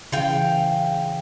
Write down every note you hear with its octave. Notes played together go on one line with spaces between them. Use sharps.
C#3 E3 F5 G5